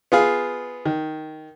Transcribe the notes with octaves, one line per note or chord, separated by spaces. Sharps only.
B3 F4 G#4 F5
D#3